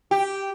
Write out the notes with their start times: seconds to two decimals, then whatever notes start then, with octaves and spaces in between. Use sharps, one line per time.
0.11 G4